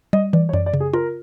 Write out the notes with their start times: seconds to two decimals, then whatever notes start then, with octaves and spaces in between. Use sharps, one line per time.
0.13 G3 D#5
0.33 E3 D5
0.49 C#5
0.53 F#2 D5
0.66 D5
0.74 C#3
0.80 G#4
0.93 F4 A#4